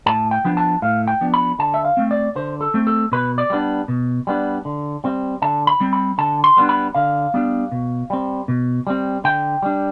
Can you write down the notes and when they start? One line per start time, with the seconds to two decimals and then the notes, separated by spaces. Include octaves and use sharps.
0.06 A2 A5
0.31 G5
0.45 F3 B3 D4
0.57 A5
0.82 A2 F5
1.08 G5
1.21 F3 B3 D4
1.34 B5
1.59 D3 A5
1.74 E5
1.85 F5
1.97 A3 C4
2.11 D5
2.36 D3 C5
2.61 A4
2.74 A3 C4
2.87 A4
3.12 B2 B4
3.38 D5
3.50 G3 B3 D4
3.88 B2
4.27 G3 B3 D4
4.65 D3
5.04 G3 C4
5.42 D3 A5
5.67 B5
5.80 G3 C4
5.93 B5
6.18 D3 A5
6.44 C6
6.57 G3 B3 D4
6.69 B5
6.95 D3 F5
7.34 G3 B3 D4
7.72 B2
8.10 G3 C4
8.48 B2
8.87 G3 C4
9.24 D3 G5
9.63 G3 D4